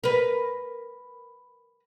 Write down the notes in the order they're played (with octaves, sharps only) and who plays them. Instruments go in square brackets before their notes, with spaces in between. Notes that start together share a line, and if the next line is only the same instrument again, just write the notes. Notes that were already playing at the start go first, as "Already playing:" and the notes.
[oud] A#4 B4